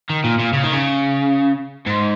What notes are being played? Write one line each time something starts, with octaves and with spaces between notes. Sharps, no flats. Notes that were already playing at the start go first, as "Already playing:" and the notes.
D#3
A#2
A#2
C#3
D#3
C#3
G#2